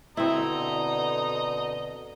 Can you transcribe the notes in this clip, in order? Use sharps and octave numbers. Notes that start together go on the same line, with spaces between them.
B2 D3 C4 E4 D#5 A#5